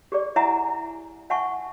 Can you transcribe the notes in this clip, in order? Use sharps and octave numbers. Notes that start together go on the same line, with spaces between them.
G4 G#4 D5
E4 E5 F#5 G#5 A#5
E5 F#5 G#5 A5 C#6